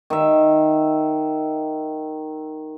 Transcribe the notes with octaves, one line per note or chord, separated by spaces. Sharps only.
D#3 E5